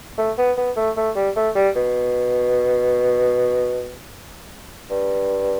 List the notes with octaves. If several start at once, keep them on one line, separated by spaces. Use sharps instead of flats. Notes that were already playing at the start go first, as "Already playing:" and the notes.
A3
B3
B3
A3
A3
G3
A3
G3
B2
G2